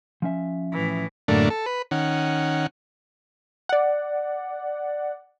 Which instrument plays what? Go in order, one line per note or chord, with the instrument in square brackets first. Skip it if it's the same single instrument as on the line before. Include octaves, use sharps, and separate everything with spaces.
[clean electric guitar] F3 C#4 E5
[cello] A2 E3
[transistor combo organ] F#2 A2 D3 A3 A#3 D4
A4
B4
D#3 C#4 F#5
[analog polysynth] D5 F#5